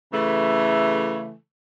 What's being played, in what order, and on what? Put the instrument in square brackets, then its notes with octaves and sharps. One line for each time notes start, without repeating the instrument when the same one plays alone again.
[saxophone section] C#3 E3 A3